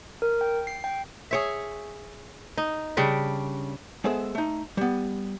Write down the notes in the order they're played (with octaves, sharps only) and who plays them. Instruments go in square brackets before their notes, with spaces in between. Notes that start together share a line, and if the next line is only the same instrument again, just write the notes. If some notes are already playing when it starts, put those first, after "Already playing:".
[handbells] A#4
G5
C7
G5
[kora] G#4 C#5 E5
D#4
C#3 G3 D4
[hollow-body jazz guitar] G#3 B3 G#4 A4 C5 E5
A3 D#4
G3 B3